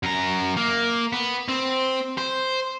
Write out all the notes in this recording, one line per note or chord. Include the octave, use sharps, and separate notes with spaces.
F#2 A#5
A#3
B3
C4
C5